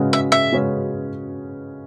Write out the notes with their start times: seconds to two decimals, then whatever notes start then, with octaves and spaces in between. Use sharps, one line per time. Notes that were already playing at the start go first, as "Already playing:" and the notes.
Already playing: C#3 G#3 C#4 F#4 B4
0.13 E5
0.32 E5
0.52 C#3 G#3 C#4 F#4 B4